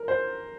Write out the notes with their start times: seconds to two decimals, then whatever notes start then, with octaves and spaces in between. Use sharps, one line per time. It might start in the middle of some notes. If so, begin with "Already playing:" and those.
Already playing: A#4
0.08 C5